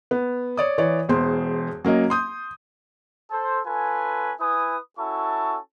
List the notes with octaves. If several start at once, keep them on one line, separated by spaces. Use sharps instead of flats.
B3
C#5 D5 D#6
E3 C#5 D5
E1 E2 C5 C6
F#3 A#3 C#4 D#5
C6 D#6 G6
A4 C5
C#4 F4 A4 B4 G#5
E4 B4 G#5 D#6
C#4 E4 F#4 A4 A5 C#6